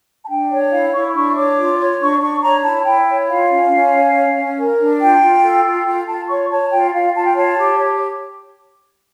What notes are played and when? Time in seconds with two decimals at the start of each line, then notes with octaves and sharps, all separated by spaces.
0.23 A5
0.28 D4 G5
0.50 C#5
0.71 E4 F5
0.93 E4 C#6
1.14 D4 C#6
1.35 C#5 D6
1.57 F4
1.78 C#5
2.00 D4 C#6
2.21 D4 C#6
2.43 C#5 A#5
2.64 E4 A5
2.85 E4 G5
3.08 C#5
3.28 F4 F5
3.50 C#4
3.71 C#4
3.93 C#5
4.14 C#5
4.35 C#4
4.57 A#4
4.79 D4
5.00 F4 G5
5.22 F4
5.43 A4
5.64 F4
5.85 F4 G5
6.07 F4 A5
6.29 C#5 C#6
6.50 C#5 A5
6.72 F4 G5
6.93 F4 F5
7.14 F4 A5
7.25 G5
7.35 C#5 A5
7.57 G4
7.78 C#5